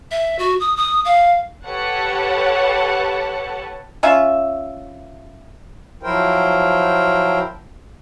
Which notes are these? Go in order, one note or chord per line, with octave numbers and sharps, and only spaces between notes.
E5
F#4
D#6
D#6
F5
G4 A4 B4 C#5 F#5 A5
C#4 F4 E5
F3 F#3 E4 A#4 C5 G5